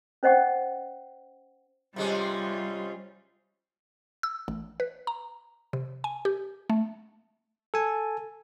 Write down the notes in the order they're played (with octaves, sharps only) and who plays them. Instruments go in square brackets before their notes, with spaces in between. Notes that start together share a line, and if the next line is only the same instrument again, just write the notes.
[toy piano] C#4 C5 D#5 F#5 G5 C#6
[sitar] C3 G#3 C#4 [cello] G3 F4
[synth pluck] E6
A1
B4
A#5
C3
G#5
G4
A3
[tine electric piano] A4 G#5